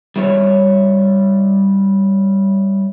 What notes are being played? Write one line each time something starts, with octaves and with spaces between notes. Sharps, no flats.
G3 E4 C#5